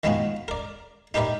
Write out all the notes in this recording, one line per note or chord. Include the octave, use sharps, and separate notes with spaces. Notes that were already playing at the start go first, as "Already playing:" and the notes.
D#3 G#3 B3 C4 F4 F#4
A#4 D5
D#4 G4 A#4 B4 D5 E5